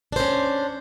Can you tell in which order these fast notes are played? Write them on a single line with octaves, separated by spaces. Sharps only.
D4 C5 C#4